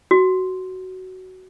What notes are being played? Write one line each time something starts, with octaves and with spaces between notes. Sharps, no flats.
F#4